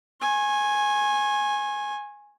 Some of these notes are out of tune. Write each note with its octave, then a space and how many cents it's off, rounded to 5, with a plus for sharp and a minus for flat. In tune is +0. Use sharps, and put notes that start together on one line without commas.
G#5 +0 C#6 -45